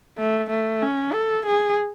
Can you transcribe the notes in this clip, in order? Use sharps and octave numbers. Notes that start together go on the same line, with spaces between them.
A3
A3
C#4
A4
G#4